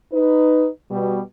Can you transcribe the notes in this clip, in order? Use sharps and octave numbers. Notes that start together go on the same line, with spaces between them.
D#4 B4
B2 G3